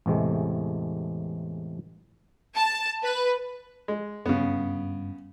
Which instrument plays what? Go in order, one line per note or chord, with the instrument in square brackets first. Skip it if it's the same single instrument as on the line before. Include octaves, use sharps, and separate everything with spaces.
[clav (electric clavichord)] A1 E2 C3 G#3 A3
[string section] A5
B4
[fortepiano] G#3
[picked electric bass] F#1 G2 [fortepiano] C#3 B3